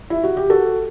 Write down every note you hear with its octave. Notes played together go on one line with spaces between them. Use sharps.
E4
F#4
G4
F#4 A4